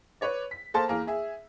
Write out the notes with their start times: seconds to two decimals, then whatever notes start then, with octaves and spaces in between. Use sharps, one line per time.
0.21 B4 C#5 D5
0.51 B6
0.74 A#3 A4 C5 A5
0.88 E2 A#3 G#4 A#4
1.07 G#4 E5